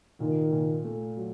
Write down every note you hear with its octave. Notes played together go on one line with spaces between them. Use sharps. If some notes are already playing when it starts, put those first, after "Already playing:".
A#2 D#3
A#2
A3
F#3